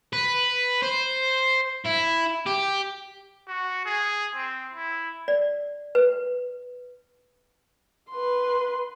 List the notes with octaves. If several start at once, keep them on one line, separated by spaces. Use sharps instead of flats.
B4
C5
E4
G4
F#4
G#4
C4
E4
D5
B4
B4 C6